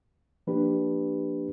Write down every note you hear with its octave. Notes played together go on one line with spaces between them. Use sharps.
F3 A#3 D4 G4 B4